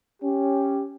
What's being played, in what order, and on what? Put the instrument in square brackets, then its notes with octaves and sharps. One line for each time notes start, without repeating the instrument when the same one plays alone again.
[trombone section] C#4 G4